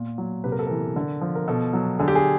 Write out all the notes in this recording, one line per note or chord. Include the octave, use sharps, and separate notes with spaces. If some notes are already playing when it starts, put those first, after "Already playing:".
Already playing: A#2
F#3
C3 B4
A#4
A4
E3 A#4
D3
F3
A#4
B2 A4
F#3
D3 G#4
G4
G#4